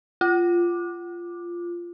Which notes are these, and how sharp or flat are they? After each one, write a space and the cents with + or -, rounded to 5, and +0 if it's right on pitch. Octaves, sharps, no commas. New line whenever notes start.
F4 -10 D6 +10